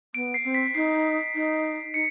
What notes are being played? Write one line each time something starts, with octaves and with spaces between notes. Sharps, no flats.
B3 D7
C7
C4
B6
D#4 C7
D#4
D#4 C#7